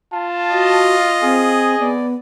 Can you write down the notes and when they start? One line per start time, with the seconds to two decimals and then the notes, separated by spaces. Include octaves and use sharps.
0.13 F4 A5
0.51 F#4 D#5
1.23 C4 G#4
1.80 B3 D5